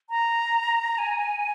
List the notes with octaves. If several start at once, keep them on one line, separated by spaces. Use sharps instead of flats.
A#5
G#5